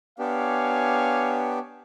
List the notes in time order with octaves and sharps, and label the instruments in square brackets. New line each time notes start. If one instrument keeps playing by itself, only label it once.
[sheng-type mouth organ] B3 D4 G4 [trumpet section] C#5 F5 G#5